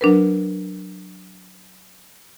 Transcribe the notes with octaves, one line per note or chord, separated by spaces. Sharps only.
F#3 D4 A#4 B4